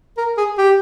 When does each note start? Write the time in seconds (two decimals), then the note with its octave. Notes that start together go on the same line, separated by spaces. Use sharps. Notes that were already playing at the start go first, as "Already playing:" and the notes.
0.18 A#4
0.37 G#4
0.58 G4